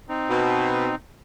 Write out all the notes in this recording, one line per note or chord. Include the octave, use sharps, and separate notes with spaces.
C4 D#4
B2